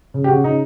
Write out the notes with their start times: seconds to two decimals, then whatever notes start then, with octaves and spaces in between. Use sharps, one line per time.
0.14 C#3
0.24 G4
0.28 C#3 F#4
0.44 C#3 D#4